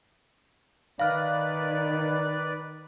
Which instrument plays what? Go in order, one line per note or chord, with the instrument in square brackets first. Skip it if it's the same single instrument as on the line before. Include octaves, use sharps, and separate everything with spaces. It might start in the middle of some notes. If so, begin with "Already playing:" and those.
[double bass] D#3 [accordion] B4 D5 [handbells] F5 F6